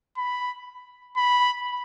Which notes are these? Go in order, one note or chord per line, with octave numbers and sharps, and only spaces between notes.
B5
B5